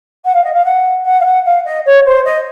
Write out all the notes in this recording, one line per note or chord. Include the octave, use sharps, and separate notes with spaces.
F#5
F5
D#5
F5
F#5
F#5
F5
F#5
F5
D#5
C#5
C5
D#5